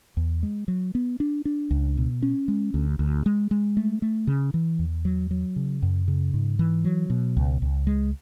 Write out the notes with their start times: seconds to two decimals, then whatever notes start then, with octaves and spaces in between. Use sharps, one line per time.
0.17 E2
0.43 G#3
0.68 F#3
0.95 B3
1.20 D4
1.45 D4
1.71 C#2
1.97 B2
2.23 C#4
2.48 G#3
2.74 D2
2.99 D2
3.26 G#3
3.51 G#3
3.77 A3
4.02 A3
4.27 C#3
4.54 E3
4.79 E2
5.05 F#3
5.31 F#3
5.56 C#3
5.82 F#2
6.08 C#3
6.34 G#2
6.59 E3
6.84 F#3
7.10 B2
7.37 C#2
7.62 C#2
7.87 G#3